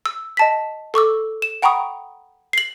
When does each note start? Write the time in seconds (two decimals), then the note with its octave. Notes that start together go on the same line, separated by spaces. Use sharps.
0.06 E6
0.37 D#5 A5 B6
0.94 A4 C#6 D6 E6
1.42 E7
1.62 F#5 G5 A#5 B5 C#6 D#6
2.53 C7 F#7